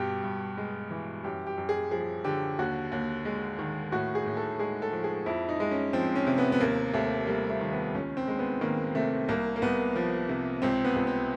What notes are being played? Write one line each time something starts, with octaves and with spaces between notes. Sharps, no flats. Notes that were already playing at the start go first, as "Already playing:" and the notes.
Already playing: G2 B2 G4
G2
G#3
E3
F#2 G4
G4
F#2
G#4
F3 G#4
D3 G4
D#2 F#4
D#2
G#3
D#3
A2 F#4
G#4
A2
A4
G#3 G#4
A4
F3
G#4
F2 E4
D#4
G#3
C#4
F3 C4
C#4
C3
B3
B3
D#2 A#3
D#2 A3
G3 A#3
A3
D#3
B3
C#2 C#4
C4
G#3
B3
D#3 A#3
C3 A3
C2 A#3
A#3
C2 B3
F3
C3
C#2 C4
B3
C#2
C4